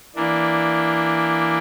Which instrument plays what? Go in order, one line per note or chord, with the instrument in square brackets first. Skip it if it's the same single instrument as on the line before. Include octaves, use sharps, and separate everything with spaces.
[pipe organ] E3 A#3 D4